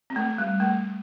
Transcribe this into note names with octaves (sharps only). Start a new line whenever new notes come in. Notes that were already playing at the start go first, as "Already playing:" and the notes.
C4
A3
G3
A3